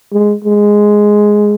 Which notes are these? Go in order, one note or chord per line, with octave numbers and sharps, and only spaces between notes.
G#3
G#3